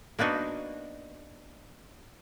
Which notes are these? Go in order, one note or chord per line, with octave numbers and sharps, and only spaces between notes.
A#3 B3 D4 D#4 F#4